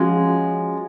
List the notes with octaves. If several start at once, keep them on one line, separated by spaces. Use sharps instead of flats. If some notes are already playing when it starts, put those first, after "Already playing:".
Already playing: F3 G#3 C#4 F#4 C#5